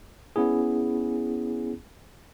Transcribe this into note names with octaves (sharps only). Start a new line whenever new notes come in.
B3 C#4 E4 G#4